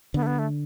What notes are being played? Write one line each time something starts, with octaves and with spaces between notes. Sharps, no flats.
D3 B3
A3
B3
A3